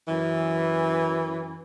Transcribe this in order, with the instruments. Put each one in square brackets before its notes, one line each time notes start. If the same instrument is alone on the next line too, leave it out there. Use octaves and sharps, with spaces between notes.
[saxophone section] F#2 E3